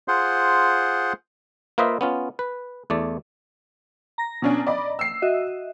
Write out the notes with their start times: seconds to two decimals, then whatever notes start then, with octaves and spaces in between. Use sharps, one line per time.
0.08 F4 G#4 C5 F#5 C6
1.78 A#3 F4 B4 C5 D#5 E5
2.01 B3 C#4 F4
2.39 B4
2.90 E2 A3 D5
4.18 A#5 A#6
4.42 B2 C#4 D4
4.67 D5 D#5 B5
4.99 E6 C7
5.22 F#4 D#5 E5